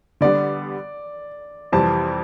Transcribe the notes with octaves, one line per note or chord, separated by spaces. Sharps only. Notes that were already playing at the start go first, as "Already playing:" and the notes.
D3 G3 B3 D5
F2 C3 E3 G3 C4 A5